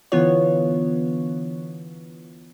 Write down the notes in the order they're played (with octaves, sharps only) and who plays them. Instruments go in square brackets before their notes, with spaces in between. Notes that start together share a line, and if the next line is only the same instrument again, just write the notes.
[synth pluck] D3 E3 B3 F4 C#5